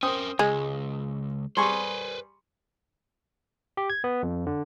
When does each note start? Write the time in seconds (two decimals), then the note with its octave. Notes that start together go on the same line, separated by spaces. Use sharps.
0.03 C#4 A#4 C5 G5 D#6
0.39 C#2 G#3
1.57 G3 G#4 B4 C5 C6 C#6
3.77 G4
3.90 G#6
4.04 B3
4.23 F2
4.47 D3